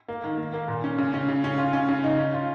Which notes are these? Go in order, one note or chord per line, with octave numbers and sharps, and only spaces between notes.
A#3
D#3
A#3
A#3
A#2
C#4
C#3
C#4
C#3
C#4
F4
C#4
C#3
D#4
C#4
F4